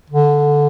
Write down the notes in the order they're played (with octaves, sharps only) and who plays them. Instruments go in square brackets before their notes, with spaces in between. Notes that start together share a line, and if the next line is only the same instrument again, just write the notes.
[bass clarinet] D3